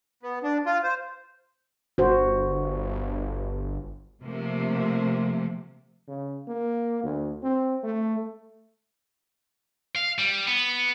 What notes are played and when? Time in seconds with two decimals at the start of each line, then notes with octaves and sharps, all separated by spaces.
0.23 B3
0.43 D4
0.66 F4
0.83 C5
1.98 G1 F#4 C5
4.24 C3 F3 A3 A#3
6.08 C#3
6.48 A#3
7.03 D2
7.43 C4
7.83 A3
9.96 F5
10.19 G3
10.47 B3